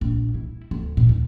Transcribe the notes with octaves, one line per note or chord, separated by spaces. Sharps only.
A#1
E4
D2
A#2
D#2